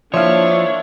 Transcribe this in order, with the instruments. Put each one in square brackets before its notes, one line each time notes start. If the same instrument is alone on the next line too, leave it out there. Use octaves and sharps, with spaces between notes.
[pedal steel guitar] F3 [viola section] A#3 D4 E4 [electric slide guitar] C#5 [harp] E5 F5